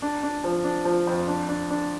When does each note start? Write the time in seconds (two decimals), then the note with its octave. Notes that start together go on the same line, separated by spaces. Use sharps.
0.02 D4
0.23 D4
0.44 F3
0.64 D4
0.85 F3
1.07 F2
1.28 D4
1.49 D4
1.70 D4